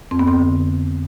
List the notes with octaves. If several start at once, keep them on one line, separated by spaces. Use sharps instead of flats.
F2 C4
B3
C4
D3